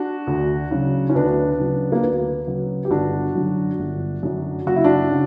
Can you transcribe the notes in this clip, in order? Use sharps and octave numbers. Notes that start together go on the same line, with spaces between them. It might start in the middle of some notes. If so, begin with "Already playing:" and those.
Already playing: D4 F#4
D2
C#3 F#3
C#4
D2 B3 D4
C#3 F#3
A#3
D2 B3
C#3 F#3
G4
G1 D4 F#4
F#2 D3 F#3
G1
F#2 D3 F#3
F#1 F#4
E4
D4 F#4
C#3